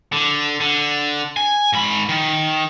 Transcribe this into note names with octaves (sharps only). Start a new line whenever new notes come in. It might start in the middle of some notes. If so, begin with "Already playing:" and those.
D3
D3
G#5
G#2 B5
D#3